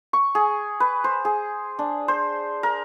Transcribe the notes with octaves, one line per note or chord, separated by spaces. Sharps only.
C#6
G#4
B4
C5
G#4
D4
C5
A#4